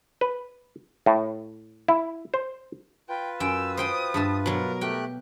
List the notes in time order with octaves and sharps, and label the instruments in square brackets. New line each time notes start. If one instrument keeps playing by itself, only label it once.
[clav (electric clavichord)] B4
A2
E4
C5
[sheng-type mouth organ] F4 B4 [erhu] G5
[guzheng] F#2 G5 [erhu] E6
[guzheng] C5 G5 C6 [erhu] D#6
[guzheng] G2 E5 A5
[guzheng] B2 F#3 [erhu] A#4
[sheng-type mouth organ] A3 G4 F#6 [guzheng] G5